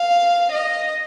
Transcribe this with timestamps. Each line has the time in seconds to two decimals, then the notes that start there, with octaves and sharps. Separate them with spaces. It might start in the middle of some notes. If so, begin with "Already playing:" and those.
Already playing: F5
0.52 D#5